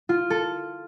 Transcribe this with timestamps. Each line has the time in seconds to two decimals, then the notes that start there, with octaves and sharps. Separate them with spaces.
0.09 F4
0.30 A4